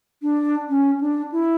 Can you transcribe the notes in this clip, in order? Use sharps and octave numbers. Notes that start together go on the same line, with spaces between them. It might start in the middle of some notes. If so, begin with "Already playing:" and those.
D4
C#4
D4
E4